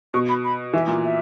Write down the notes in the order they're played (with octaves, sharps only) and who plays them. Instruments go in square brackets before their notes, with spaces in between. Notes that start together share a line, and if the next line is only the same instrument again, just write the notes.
[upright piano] B2 [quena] C#6
[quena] B5
B5
[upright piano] E3 [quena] E5
[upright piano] A#2
[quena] E5